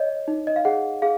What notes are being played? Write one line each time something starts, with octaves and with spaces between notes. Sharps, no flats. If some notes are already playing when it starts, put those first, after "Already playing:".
Already playing: C#5 D#5
D#4
D#5
F5
G#4 F#5
G#4 F5